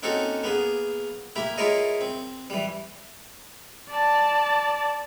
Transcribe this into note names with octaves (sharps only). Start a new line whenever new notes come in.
A#3 C4 C#4 D#4 F#4 A4
A#3 B3 G#4
A#3 E4 G4
E4 F4 G#4 A#4 C#5 D#5
C4
E3 G3
D5 A5